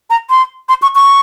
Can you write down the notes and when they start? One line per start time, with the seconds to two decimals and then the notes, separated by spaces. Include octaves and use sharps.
0.10 A#5
0.30 C6
0.69 C6
0.82 C#6
0.95 C#6